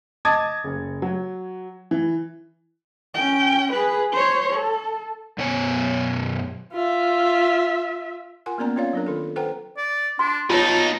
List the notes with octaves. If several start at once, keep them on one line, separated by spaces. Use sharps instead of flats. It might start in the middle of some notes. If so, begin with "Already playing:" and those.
D#5 A5 D6 D#6 G#6 A6
F#1
F#3
E3
C#4 G5
G#4 B4
C5 C#5
A4
F#2 B2 B3 C#5 G#5
F4 E5
F4 A#4 F#5 G#5 C6
A#3 B3 C#4 A#4 D5 A#5
C4 C#4 F4 C#5 D5 F5
F#3 D4 A#4
D#3 F4 A4
A4 B4 C5 F#5 G5 A#5
D5
D4 C6
B2 D#4 F4 C#5 A5